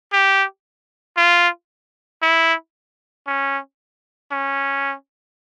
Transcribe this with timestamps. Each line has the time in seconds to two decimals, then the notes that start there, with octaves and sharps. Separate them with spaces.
0.13 G4
1.17 F4
2.22 E4
3.27 C#4
4.32 C#4